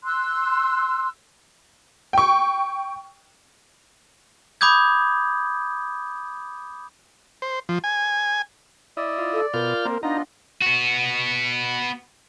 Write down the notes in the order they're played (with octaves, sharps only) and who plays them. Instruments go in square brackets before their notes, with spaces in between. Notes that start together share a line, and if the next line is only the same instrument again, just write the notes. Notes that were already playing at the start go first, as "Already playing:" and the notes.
[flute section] C6 E6 F#6
[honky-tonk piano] G5 C#6
[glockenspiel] B5 D6 D#6 G6 G#6
[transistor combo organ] C5
F3
G#5
[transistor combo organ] E4 D#5 [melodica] D5
[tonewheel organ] F4
[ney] A4
[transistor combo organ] B2 [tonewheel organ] F4 F6 G6 [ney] A#4
[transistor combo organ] A#3 C4
[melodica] B3 F4 D#5 [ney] D4 [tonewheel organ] D#4 [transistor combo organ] A#5
[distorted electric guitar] B3 F#4